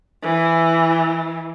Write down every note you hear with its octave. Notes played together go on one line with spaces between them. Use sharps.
E3